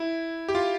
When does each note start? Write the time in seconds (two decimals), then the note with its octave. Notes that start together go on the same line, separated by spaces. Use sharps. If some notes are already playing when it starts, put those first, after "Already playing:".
Already playing: E4
0.49 G4
0.55 F4